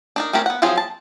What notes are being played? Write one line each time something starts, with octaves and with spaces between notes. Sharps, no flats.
D4 D#4 A#4
A3 C4 C#4 G4 A#4
B3 F#5
F3 F#3 C4 F4 G#4
A5